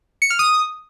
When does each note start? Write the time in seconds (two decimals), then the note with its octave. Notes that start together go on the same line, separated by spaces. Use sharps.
0.22 C#7
0.30 F6
0.39 D#6